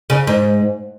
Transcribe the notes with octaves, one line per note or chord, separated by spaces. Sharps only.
C#3
G#2